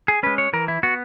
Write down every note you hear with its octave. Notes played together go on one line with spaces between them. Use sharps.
G#4
G#3 C#4 B4
C#5
E3 A#4
E4
B3 F#4